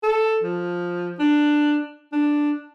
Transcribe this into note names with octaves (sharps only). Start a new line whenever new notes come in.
A4
F3
D4
D4